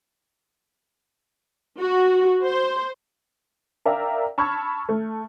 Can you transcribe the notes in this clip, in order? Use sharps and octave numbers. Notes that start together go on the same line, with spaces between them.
F#4
C5
A#4 D5 E5 F5 G5 A#5
A5 B5 C#6 E6 F6 G#6
A3